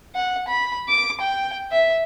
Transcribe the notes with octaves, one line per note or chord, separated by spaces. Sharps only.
F#5
B5
D6
G5
E5